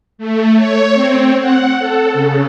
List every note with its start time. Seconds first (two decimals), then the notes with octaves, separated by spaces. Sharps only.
0.18 A3
0.56 C#5
0.94 C4
1.39 F#5
1.79 A4
2.14 C#3